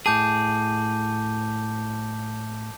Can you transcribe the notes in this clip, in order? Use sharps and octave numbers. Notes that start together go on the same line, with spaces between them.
A2 G#4 A5 D6 G6